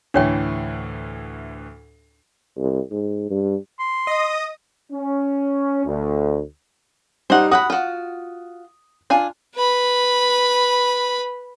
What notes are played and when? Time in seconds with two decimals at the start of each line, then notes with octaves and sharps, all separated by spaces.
0.14 D2 A2 E3 D4 C#5 G5
2.57 C2
2.91 G#2
3.30 G2
3.79 C6
4.07 D#5 D#6
4.92 C#4
5.86 D2
7.30 G3 D#4 C5 F#5
7.52 F#4 F#5 B5 D#6
7.70 F4 F#4
9.10 D4 F4 F5 G#5
9.56 B4 B5